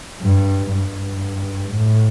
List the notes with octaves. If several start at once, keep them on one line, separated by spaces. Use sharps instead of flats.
G2
G2
A2